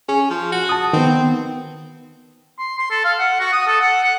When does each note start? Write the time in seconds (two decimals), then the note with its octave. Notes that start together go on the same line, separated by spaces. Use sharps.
0.09 C#4 G#4
0.30 F3
0.52 F#4
0.69 A5 D#6
0.93 D#3 B3 C4
2.59 C6
2.78 C6
2.91 A4
3.04 F5
3.19 F#5
3.40 F#4
3.52 D#6
3.67 A4
3.81 F#5
4.03 F#5